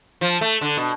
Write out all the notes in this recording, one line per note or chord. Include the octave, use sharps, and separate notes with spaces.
F3
A3
D3
B2